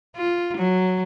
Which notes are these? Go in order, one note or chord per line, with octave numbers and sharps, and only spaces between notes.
F4
F#3